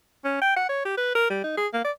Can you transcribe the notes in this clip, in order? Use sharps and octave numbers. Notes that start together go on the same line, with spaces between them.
C#4
G5
F#5
C#5
G4
B4
A#4
G3
D#4
G#4
A#3
D5